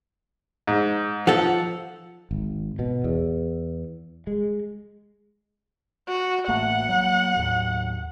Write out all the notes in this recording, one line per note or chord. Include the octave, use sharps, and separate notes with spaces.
G#2
F3 A4 F#5
G#1
B2
E2
G#3
F#4
A1 A3 A#3 F#5
F#3 A#3
D#2 A2 F#3